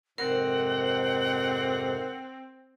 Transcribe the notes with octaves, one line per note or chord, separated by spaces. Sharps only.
F2 G#2 C3 C4 A#4 F#5